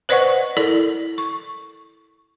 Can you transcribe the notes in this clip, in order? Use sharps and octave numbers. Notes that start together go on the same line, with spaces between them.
B4 C5 D5 D#5 F#5 C#6
E4 A4 A#4 D5
C#6